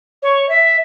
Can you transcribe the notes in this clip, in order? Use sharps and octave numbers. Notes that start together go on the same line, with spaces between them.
C#5
E5